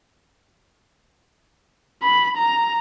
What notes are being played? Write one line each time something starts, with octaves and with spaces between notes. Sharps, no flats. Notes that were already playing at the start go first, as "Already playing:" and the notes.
B5
A#5